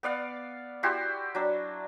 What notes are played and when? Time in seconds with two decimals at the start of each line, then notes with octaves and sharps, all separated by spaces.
0.03 B3 D5 F5 F#5
0.83 E4 F#4 G4 C6
1.35 F#3 D4